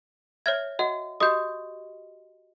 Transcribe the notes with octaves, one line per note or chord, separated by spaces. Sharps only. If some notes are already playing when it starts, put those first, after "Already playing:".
C#5 E5 F6 G#6
F#4 D#5 F#5
F#4 G4 D#5 D#6 G6